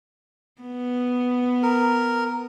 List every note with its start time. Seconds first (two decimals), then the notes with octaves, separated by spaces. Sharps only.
0.62 B3
1.63 A#4